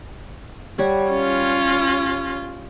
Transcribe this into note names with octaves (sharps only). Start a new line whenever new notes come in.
G3 C#5 F#5
C#4 F4